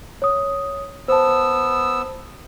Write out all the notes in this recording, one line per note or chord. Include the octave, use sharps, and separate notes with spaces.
C#5 D#6
B3 C5 A5 E6